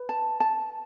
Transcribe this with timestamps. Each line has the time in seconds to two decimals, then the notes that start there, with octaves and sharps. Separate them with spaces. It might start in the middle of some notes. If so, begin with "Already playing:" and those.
Already playing: B4
0.09 A5
0.40 A5